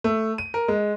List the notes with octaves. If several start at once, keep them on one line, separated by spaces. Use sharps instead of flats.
A3
D#7
A#4
G#3